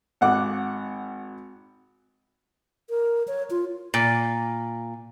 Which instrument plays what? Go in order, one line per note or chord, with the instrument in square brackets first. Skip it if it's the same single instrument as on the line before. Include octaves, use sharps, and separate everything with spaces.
[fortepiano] G#1 F#5 D6
[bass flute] A#4
C#5
F4
[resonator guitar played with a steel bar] A#2